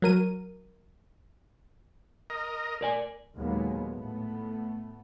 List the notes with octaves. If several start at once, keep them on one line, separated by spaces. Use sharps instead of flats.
F#3 A#4 D#7
A#4 D#5
A#4 D5 G#5
D#2 A#2 F#3 G#3 A#3 B3
A2 A3 B3